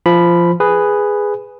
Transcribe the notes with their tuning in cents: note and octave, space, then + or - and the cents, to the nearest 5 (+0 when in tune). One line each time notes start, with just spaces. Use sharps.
F3 -15 B5 +0
G#4 -5 B4 +5